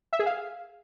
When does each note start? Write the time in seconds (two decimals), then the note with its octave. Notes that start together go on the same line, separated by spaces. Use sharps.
0.13 E5
0.19 G#4
0.26 F5